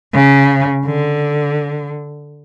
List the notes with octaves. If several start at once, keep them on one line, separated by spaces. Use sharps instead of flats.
C#3
D3